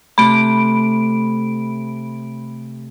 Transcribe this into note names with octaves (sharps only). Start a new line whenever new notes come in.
C3 A3 B5 D7